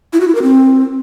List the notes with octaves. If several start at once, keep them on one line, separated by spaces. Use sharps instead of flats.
E4
F#4
E4
A#4
C4